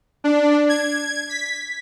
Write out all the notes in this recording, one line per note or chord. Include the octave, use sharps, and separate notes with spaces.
D4
G#6
B6